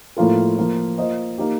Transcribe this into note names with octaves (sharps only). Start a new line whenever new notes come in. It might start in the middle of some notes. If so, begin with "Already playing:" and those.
A2 F3 A#3 F4 A4
F3 A#3 F4
A#3 F4 C5 D#5
A#3 D#4 G4